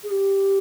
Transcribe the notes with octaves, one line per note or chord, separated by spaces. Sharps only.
G#4
G4